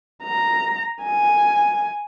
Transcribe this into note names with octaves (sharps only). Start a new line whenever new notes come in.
A#5
G#5